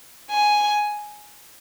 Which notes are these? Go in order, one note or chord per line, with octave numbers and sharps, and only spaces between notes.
G#5